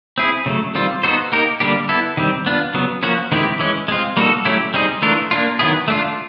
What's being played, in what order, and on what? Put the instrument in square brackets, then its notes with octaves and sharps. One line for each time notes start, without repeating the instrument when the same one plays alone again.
[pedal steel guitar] C4 E4 G#4
C#3 F#3 A3
D#3 G3 C4 F4
B3 D#4 F#4 A4 C5
A#3 D#4 G4 A#4
D3 G3 A#3 D4 G4
B3 E4 A4
D#3 G3 C4
B3 D4 F4
C#3 F#3 B3
F3 A#3 C#4 F#4
D#3 G#3 C4 E4 G4
E3 G#3 C#4
G#3 C4 F4
G3 A#3 D#4 F#4 A4
F#3 A3 C#4 E4 G4
G3 C4 D#4 G#4
E3 A3 D4 F4 A#4
A#3 D4 F4
D#3 F#3 B3 E4 G#4
A3 D4 F4